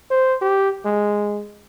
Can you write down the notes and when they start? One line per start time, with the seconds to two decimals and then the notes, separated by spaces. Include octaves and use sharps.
0.11 C5
0.42 G4
0.85 G#3